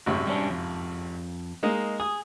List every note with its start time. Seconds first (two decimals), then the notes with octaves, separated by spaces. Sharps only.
0.06 G#1 F#2 C3
0.27 G3 C#4 D4
0.50 F2
1.63 G#3 A#3 D#4
2.00 G#4 D#6